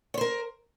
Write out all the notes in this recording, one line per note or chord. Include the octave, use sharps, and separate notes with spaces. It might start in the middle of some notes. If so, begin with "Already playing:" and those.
A#4 C5 C#5